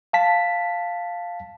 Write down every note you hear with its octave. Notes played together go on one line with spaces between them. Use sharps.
F5 A5 B6